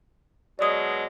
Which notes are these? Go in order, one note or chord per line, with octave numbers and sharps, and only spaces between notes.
B2 F#3 G#3 D5 D#6